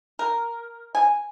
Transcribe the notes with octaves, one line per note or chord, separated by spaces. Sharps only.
A#4
G#5